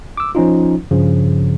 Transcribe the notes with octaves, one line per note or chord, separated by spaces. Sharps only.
D6 E6
F3 C#4 D#4 F4
G2 C#3 F3